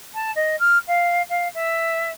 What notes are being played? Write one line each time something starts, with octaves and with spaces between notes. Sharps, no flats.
A5
D#5
F6
F5
F5
E5